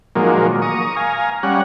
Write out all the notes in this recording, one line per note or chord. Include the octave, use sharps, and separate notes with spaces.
A#2 D#3 F3 F#3 G#3 A#3
A#5 C#6 D#6
F5 G#5 A#5
G3 C#4 F#5